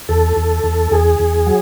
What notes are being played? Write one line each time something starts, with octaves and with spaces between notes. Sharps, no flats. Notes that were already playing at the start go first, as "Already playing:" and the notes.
E2 A4
E2
E2
E2 G#4
E2
F#3